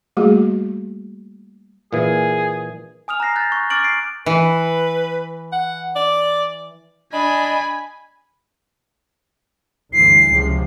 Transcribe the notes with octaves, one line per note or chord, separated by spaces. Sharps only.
G3 A3 A#3 F#4 G#4
A#2 E3 G#4
G#5 D#6 F6 F7
A#5 F#6 A#6 C7
F#6 G6 A6
C#6
D6 F6 A6 D7 F#7
C7 D7
E3 B4
F#5
D5
D4 D#5 G#5 B5
D2 G2 E3 C7
C#2 C3 F3